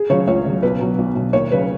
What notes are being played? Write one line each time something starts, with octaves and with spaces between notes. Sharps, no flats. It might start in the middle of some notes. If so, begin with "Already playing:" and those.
Already playing: G#4
C#3 F#3 C#5
C#2 C#5
C#3 F#3
B1 B4
B2 F#3
B1
B2 F#3
D#2 C#5
C#3 F#3 B4